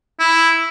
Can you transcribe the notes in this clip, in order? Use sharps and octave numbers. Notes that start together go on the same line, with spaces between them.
E4